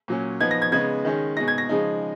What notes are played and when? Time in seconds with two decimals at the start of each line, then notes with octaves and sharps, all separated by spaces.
0.08 A#2 F#3 C#4
0.40 F3 B3 D#4 G#6
0.51 A#6
0.62 G#6
0.72 C#3 G#3 B3 D#4 G#6
1.05 D#3 G#3 C#4
1.37 B2 G#3 D#4 A#6
1.48 G#6
1.58 A#6
1.69 C#3 F3 G#3 D#4